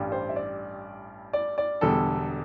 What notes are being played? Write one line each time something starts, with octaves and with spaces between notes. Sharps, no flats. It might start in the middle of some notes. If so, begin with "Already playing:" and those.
Already playing: A1 G2 G3
C5
E5
D5
D5
D5
E1 E2 D3 G3 A4